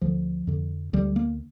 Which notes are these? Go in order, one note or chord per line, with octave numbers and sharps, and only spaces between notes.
D2 D3 F3
F2 D3
D2 D3 G3
A#3